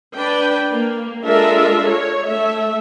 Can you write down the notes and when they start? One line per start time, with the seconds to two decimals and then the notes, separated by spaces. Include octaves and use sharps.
0.15 D4 B4 G5
0.71 A#3
1.24 G#3 D4 F4 A4 A#4 E5
1.87 C#5
2.25 A3 E5